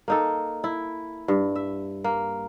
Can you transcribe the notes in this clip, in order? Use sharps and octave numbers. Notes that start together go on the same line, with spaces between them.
A#3 D#4 A4
E4
G2
E5
A#3